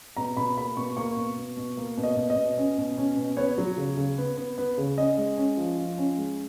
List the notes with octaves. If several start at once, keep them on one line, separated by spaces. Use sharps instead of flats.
B2 A#5
B2 B5
A#3 B5
B2 C#6
A#3 C#6
B2
B2
B2
A#3
B2
D#5
B2
D#5
B2
C#4
B2
C#4
B2
B3 C#5
F#3
C#3
C#3
B3
B3
B3
C#3
C#4 D#5
G#3
C#4
F3
F3
C#4
G#3